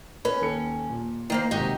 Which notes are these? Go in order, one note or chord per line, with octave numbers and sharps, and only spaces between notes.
C#4 B4 B5
D#2 A4 C#7
A#2
D#3 A#3 C5
G#1 C3 D#4 F#4 G4